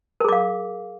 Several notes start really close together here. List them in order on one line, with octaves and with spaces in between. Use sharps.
A#4 G#4 D6 F5